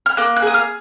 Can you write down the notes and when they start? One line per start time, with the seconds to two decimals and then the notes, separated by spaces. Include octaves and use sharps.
0.06 F6
0.17 A#3 F#6
0.36 F#6
0.42 G#4 D#6
0.54 F6